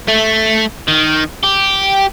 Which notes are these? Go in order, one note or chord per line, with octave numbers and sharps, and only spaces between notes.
A3
D#3
G4